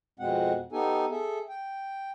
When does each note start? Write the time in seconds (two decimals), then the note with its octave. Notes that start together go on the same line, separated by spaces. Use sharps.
0.20 F2 B2 G#3 C4 F#5
0.72 B3 D#4 G4 A4 G#5
1.11 G#4 A4 E5
1.49 G5